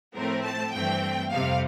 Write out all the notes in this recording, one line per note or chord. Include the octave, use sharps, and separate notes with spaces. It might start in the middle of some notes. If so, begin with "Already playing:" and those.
A2 F3 A3 C4 A#4
A5
G2 E3 A3 C4 G5
F2 C3 G3 F5